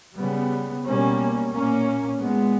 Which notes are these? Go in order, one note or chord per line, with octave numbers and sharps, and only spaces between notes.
C#3 G3 B3
B2 G3 A#3 C#4
A#2 A#3 C#4
A#2 G#3 B3